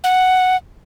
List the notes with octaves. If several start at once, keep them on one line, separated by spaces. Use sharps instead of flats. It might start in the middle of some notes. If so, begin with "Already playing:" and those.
F#5